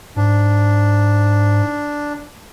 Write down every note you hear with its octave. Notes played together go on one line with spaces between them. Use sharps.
G#2 D4